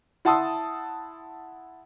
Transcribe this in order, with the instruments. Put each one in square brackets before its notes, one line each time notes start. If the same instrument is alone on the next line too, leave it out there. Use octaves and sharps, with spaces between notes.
[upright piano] E4 F#5 A5 C6 D#6 E6